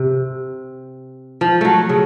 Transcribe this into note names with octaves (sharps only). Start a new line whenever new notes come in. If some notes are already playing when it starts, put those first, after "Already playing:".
Already playing: C3
F3
F#3 A3
C#3